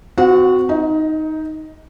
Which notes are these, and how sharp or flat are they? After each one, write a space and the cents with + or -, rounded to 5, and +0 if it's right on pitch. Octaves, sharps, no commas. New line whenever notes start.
C4 -40 F#4 +0 F#5 -35
D#4 +5 D#5 +30